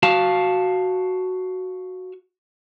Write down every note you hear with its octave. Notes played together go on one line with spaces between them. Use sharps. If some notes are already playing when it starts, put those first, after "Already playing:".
F#4 F5 A5